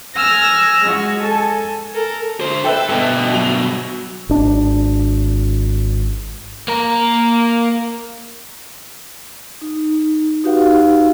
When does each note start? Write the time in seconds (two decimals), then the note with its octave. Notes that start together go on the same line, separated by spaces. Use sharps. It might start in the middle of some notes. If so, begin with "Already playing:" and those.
0.15 G#5 E6 F6 A#6
0.82 G#3 F#4
1.22 A4 G#5
1.93 A4 A#4
2.41 D3 C5
2.64 A4 B4 E5 G5
2.89 G2 B2
3.32 F#3 F7
4.29 G#1 D4
6.68 A#3 A#4
9.61 D#4
10.44 D#4 F#4 G4 B4 F5 F#5